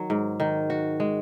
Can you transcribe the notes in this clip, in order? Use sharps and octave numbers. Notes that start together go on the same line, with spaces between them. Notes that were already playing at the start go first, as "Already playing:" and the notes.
Already playing: D#3 F#3
G#2
D#3
F#4
G#3